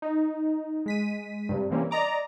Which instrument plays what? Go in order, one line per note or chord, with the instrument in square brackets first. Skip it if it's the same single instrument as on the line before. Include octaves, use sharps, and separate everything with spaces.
[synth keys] D#4
G#3 B6 D#7
G2 C3
C3 E3 G3 A#3 C4 C#4
D5 D#5 A#5 D6